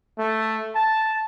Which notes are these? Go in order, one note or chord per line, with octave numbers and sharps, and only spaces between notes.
A3
A5